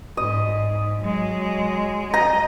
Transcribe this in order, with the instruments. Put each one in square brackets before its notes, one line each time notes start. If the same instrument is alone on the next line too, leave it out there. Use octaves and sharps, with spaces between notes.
[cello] G#2 [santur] D#5
[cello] F#3 G#3
[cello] D#5 [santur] A#5